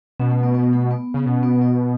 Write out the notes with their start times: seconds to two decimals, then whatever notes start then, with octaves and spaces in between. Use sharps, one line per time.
0.20 B2 C#4
0.31 A3
0.43 B3
0.55 B3
0.73 A3
0.91 B3
1.14 C#3
1.26 B2 C#4
1.43 B3
1.62 B3